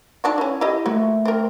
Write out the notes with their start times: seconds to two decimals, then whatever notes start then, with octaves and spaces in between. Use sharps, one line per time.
0.24 D#3 D4 F#4
0.38 E3 C#4
0.61 E4 G4 D#5
0.86 A3 A#3 F4 F#4
1.25 C4 A#4